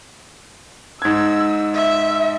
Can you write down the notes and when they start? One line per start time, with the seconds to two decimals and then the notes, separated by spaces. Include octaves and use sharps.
1.02 G#2 E6 G#6
1.75 E5